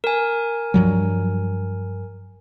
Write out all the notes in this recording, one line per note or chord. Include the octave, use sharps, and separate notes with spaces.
A#4 G#5
G2 F3 F#3